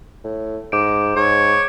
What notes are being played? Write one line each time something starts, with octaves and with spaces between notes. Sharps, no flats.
A2
G#2 D6 G6 D7
G#2 C#5